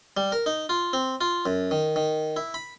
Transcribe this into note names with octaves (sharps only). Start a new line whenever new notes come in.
G3
A#4
D#4
F4
C4
F4
F#2
D#3
D#3
E4
B5